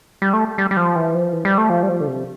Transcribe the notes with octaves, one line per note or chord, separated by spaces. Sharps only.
G3
A3
G3
G3
F3
E3
F3
E3
G3
A3
F3
G3
F3
D3
C3